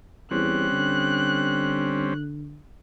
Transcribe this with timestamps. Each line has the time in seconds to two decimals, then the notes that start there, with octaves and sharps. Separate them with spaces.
0.31 E2 G3 C4 C#4 F#6
0.72 D3